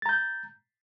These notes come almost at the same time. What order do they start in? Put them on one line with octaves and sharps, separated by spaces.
A6 A#5 G6